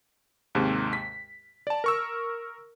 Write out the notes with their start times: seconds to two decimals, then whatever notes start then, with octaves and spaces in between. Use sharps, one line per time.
0.55 D#2 G#2 C3
0.93 B6
1.67 D5 A5
1.84 A#4 C#6 E6